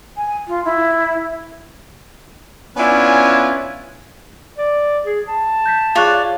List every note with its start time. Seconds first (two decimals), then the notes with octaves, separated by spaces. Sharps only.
0.17 G#5
0.47 F4
0.64 E4
2.77 B3 C#4 D4 E4 F4 G#5
4.58 D5
5.05 G#4
5.28 A5
5.66 G6 A#6 B6
5.95 F4 G#4 C#5 D5 F#6